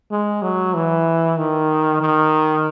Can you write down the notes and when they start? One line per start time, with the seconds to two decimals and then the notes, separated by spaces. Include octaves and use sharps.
0.11 G#3
0.42 F#3
0.74 E3
1.38 D#3
2.01 D#3